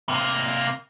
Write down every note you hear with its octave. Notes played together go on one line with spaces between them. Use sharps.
C3 A#3